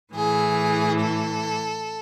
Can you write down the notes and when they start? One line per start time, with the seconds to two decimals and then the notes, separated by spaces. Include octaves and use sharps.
0.13 A2 E3 G#4
0.99 A4